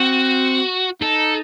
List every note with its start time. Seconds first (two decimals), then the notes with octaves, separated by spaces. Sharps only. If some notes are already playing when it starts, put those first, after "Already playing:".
Already playing: C4 F#4
1.01 D#4 A4